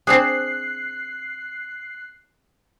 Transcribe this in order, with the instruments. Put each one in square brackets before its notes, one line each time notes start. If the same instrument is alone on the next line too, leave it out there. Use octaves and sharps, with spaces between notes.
[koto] C4 D4 G#4 [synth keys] F#6 C7